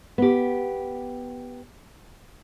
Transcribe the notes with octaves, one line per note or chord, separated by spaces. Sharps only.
B3 G4